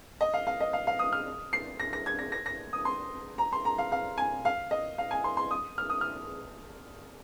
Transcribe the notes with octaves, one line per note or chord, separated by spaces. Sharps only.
D#5
F5
F5
D#5
F5
F5
D#6
F6
C7
A#6
A#6
G#6
A#6
A#6
A#6
D#6
C6
A#5
C6
A#5
F5
F5
G#5
F5
D#5
F5
G#5
C6
C6
D#6
F6
D#6
F6